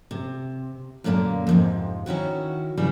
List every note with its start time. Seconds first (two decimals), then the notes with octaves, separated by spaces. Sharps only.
0.11 C3
1.04 F#2 A#2 D3 A3 A#3
1.47 F2 G#2 C3
2.06 D#3 C#4 E4 F#4
2.77 C#3 E3 G3 B3 E4